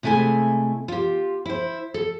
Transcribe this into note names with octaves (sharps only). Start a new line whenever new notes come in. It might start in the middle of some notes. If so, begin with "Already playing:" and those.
C3 G#3 A3 E4 G#5
F4 G4
E4 C5
A4